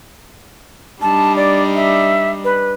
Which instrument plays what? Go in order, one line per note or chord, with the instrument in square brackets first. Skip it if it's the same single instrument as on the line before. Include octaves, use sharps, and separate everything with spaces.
[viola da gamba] G3 D4 D#4 [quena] A5
[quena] D5
E5
B4